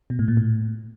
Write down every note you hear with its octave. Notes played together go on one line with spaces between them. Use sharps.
B2
A2
A#2
A2